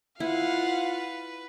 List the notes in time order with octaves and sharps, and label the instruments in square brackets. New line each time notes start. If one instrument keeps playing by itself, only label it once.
[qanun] E4 [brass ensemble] F4 [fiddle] B4 [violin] F5 F#5